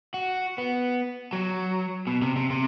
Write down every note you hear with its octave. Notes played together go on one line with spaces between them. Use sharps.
F#4
B3
F#3
B2
C3
C3
C3